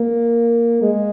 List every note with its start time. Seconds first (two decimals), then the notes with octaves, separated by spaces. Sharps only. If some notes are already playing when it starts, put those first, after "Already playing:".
Already playing: A#3
0.82 G#3